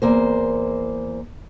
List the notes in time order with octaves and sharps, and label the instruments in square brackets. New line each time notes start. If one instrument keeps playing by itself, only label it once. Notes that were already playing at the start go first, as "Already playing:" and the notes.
[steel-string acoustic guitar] E2 A#3 C5